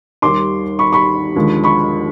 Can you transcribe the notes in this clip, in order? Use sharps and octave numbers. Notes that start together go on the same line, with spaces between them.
D#2 D#3 G3 C6 D6
B5 C#6
B5 C#6
D#2 D3 F3 G#3
B5 C#6